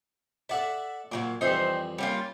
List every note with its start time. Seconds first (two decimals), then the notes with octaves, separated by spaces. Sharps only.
0.49 A4 D5 E5 F#5 A5
1.12 A#2 F#3 G3 A#3
1.41 F2 E3 G3 D#4 C5 E5
1.98 G3 A#3 C#4 F4